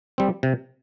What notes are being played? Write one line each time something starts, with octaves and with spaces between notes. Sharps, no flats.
G3 C4
C3